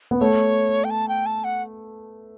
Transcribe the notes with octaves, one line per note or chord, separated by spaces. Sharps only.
B3
A3 C#5
G5
A5
G5
A5
F#5